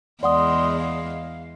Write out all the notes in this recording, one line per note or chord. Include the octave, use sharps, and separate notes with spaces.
E2 G#3 D5 F#5 C6 D#6
F5